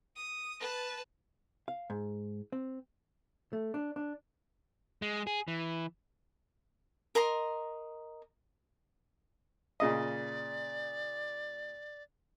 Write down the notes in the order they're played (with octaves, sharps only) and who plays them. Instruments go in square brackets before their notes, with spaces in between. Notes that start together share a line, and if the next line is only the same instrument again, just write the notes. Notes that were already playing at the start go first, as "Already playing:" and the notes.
[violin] D#6
B4 A5
[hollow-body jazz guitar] F5
G#2
C4
A3
D4
D4
[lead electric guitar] G#3
G#4
E3
[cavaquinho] A#4 D#5 A#5 C6
[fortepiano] A#2 C#3 D#5 [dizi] D5